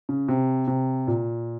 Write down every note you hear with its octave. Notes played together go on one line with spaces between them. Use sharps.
C#3
C3
C3
A#2